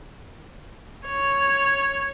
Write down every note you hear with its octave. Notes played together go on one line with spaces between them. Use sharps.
C#5